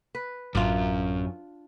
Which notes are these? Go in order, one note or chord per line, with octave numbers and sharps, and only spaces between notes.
B4
A1 F#2 D4 F4